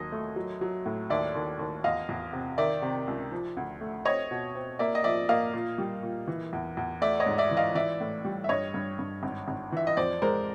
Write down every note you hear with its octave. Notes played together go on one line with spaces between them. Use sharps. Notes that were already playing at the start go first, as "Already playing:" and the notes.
Already playing: D#2 F#3 D#5
A3
F#3
F#3
A2
D#2 D5 E5
D#2
D#2
E2 D#5 F5
E2
C3
D#3 D5 E5
C3
C#2
F3
D2
A3
C4 C#5 D#5
B2
C4
A#3 D5 E5
D#5
F3 D5 E5
A#3 D#5 F5
A#2
G3
A#2
E3
E2
E2
A3 D5 E5
C#5 D#5
G#2
D5 E5
E3
D#5 F5
E3 D5 E5
A2
G3
E5
G2 C#5 D#5
G2
G2
G#1
G#1
E3 E5
D#5
F2 C5 D5
G#3 A#4 C5